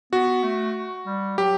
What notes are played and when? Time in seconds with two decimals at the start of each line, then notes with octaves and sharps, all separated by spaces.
0.13 B3 F#4
0.44 A3
1.06 G3
1.38 F#3 G4